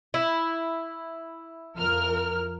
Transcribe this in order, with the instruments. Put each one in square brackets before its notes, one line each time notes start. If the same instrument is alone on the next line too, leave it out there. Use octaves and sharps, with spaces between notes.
[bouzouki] E4
[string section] F2 A#4 F6